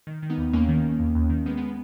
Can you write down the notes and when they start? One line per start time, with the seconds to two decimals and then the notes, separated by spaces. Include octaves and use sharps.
0.07 D#3
0.23 D#3
0.30 B3 D#4
0.38 D#2
0.53 D#2 A#3 C#4
0.69 D#3
0.84 D#3
1.00 D#2
1.15 D#2
1.30 D#3
1.46 D#3 G#3 B3
1.57 G#3 B3